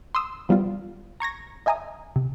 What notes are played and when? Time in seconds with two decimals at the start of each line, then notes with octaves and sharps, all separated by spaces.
0.15 C6 D#6 E6
0.49 F3 G3 B3 F4
1.20 A#5 C#6 G#6 A#6
1.66 D#5 E5 G#5 A#5 D#6
2.16 C3